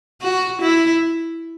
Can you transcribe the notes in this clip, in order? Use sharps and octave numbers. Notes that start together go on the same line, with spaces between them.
F#4
E4